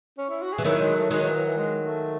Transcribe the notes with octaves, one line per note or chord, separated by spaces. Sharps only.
C#4
E4
F#4
G#4
E3
D#3 F#3 E4
G#3
A3
D#3 F#3 G#3
E3
E3
E3
G#3
A3